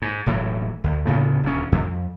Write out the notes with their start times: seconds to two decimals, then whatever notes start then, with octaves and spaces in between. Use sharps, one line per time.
0.02 G#2
0.26 E1 A2 E3 F#3
0.84 D2
1.07 D2 A2 C#3 B3
1.43 D#1 D2 C#4
1.72 F2